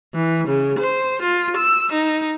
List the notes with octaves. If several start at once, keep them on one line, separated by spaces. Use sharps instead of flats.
E3
C#3
C5
F4
E6
D#4